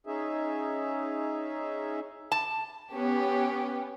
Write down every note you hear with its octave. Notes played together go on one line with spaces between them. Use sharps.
C#4 D#4 G#4 E5
A5
B3 C#4 G4